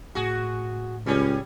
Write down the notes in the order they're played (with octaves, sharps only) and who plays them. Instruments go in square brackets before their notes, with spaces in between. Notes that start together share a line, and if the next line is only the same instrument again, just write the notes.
[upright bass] A2 [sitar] F#4 G#4
[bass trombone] C#2 [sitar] G3 C#4 G#4